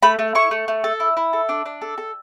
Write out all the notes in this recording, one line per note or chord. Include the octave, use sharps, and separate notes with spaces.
A3 B5
A3
E4 C#6
A3
A3
A4
E4
E4
A4
D4
D4
A4
A4